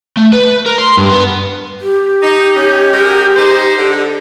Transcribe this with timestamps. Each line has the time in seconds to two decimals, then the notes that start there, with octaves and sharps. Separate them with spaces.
0.17 A3
0.33 B4
0.66 A#4
0.78 C6
0.97 G2
1.10 B3
1.81 G4
2.22 D#4
2.56 C#4
2.93 G#3 F#4 A#4
3.37 D#4 C5
3.78 D3